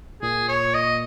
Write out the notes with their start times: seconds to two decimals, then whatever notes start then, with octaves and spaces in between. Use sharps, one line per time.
0.22 A#2 G#4
0.49 C#5
0.74 D#5